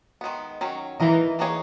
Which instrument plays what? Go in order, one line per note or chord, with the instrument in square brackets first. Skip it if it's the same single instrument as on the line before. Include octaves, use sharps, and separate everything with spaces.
[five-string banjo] D#3 G#3 B3
D#3 F#3 C#4
[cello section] E3 [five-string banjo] A#3 D#4 A#4 D#5
[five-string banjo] E3 A#3 D#4 G#4 C#5